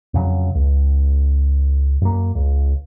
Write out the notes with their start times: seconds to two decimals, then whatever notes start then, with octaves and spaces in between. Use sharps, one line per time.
0.14 F2 C#3 F#3
0.55 C#2
2.02 F#2 A#3
2.35 C#2